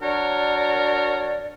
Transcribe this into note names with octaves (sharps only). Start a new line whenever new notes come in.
F#3 D4 A#4 C#5 D5